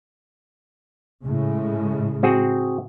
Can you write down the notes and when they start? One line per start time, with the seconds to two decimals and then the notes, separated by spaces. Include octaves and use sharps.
1.22 A2 C#3 G#3
2.23 C4 F#4 G#4